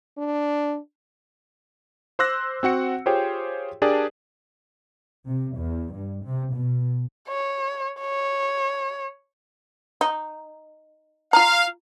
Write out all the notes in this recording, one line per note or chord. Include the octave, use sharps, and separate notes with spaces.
D4
C5 C6 D6 E6 F#6 A#6
C4 F#4 F#5 C#7
F4 G4 G#4 C5 C#5 G5
D4 G4 G#4 A#4 D5 A5
C3
E2
G2
C3
B2
C#5
C#5
D#4
F4 F5 A#5